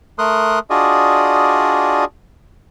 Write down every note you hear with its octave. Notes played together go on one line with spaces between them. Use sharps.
A3 A#4 C6 D#6 F#6
D4 F4 F#4 G#4 D5 D#5